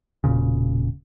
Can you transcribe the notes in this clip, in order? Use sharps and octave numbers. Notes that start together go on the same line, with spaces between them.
E1 B1 A#2 C#3